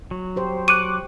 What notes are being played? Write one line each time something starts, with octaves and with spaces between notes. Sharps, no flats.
F#3
G4 C5
C#6 D6 F#6 D#7